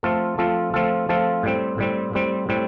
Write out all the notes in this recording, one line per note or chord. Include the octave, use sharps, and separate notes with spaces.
F3 A3 C4 F4 A4
F3 A3 C4 F4 A4
F3 A3 C4 F4 A4
F3 A3 C4 F4 A4
A2 G3 C4
A2 G3 C4
A2 G3 C4
A2 G3 C4